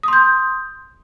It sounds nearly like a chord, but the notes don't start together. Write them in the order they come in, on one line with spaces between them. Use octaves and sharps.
D#6 C6 G6